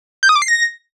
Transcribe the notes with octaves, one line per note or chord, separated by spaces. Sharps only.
G6
D#6
D6
C7
A#6